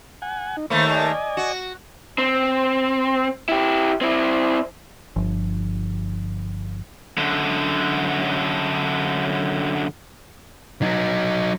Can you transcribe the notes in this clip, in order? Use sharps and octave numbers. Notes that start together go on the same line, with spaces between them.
F#5 G#5
D#4
D#2 A3 A#3 C5 B5 C#6
D5 D#5 G#5
F#4
C4
E4 G4
C4 E4
G1 F3
F#2 D3
F#3 D#4